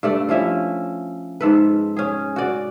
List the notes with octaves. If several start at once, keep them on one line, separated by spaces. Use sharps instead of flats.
G2 A3 D5
F3 C#4 E4 E5
G#2 A4 B4
C#4 G#4
F#4 D5